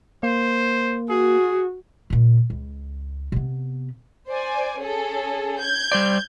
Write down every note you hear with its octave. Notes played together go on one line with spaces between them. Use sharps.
A#3 C5
F#4 G#4
A#2 C#3
C#2
C3 B3
C5 D5 G#5
C#4 G#4 A4
G6 G#6
G3 C5 D5